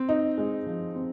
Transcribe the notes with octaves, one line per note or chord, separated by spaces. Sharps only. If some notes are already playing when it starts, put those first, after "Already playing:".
Already playing: C4
D#4
G#3
F3
C4